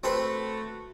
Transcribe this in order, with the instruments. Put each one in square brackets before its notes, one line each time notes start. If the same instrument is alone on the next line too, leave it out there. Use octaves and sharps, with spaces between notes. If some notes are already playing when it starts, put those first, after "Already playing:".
[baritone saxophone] A3 [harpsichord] C4 A4 B4 [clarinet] F#4